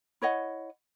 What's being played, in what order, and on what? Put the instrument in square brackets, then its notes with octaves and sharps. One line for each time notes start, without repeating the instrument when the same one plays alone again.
[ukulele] E4 C#5 D#5 F#5